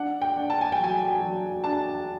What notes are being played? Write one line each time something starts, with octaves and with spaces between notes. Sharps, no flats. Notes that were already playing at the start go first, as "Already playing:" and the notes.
Already playing: D4 F#5
G5
D4
A5
G#5
G5
F#3 G#5
F#3
D4 A5